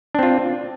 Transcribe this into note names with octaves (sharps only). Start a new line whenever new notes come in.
C4 D4 F4